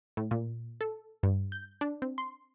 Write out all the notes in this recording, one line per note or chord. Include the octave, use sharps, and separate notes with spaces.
A2
A#2
A4
G2
G6
D4
C4
C6